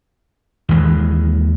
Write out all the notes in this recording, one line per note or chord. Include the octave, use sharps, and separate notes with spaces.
D#2 E3 G#3